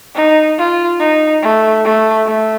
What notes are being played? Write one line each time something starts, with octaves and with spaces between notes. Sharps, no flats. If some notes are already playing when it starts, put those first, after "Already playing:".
D#4
F4
D#4
A3
A3
A3